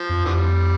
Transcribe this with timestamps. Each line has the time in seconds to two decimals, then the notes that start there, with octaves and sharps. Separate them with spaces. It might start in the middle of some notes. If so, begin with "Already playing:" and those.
Already playing: F3
0.09 F2
0.25 F2 D3 E3 G3